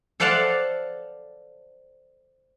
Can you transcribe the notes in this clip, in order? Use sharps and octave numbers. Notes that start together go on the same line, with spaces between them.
A4 C5 D5 F5 F#5 A5